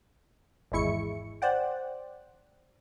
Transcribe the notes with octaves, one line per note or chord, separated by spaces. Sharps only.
G#1 E2 G#3 E4 C#6 C#7
C5 D5 F#5 G5